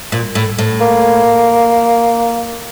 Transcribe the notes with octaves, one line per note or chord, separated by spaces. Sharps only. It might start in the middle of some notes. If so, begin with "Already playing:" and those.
A#2
A2
A2
A#3